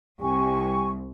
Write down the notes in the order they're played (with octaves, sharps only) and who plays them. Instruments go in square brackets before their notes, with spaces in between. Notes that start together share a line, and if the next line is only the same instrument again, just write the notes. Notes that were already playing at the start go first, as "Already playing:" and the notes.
[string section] C2 [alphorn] G4 [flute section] G#5 C#6